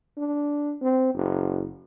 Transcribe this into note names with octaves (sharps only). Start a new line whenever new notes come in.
D4
C4
F#1